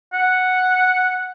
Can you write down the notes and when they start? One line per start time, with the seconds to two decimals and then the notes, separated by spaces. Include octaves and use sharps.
0.13 F#5